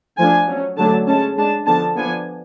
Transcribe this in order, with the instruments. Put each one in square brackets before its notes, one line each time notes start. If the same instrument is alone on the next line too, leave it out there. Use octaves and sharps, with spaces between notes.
[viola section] F3 A3 D4 G#5
F#3 C#4
D3 F#3 A3 D4 A5
G#3 C#4 A5
G#3 D4 A5
D3 F3 B3 D4 A5
F3 B3 D4 G#5